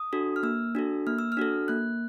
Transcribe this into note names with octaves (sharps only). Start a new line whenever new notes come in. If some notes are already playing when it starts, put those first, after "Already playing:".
Already playing: D#6
D4 F#4 A4
F6
A#3 E6
D4 F#4 A4
A#3 F6
E6
F6
D4 F#4 A4
A#3 F#6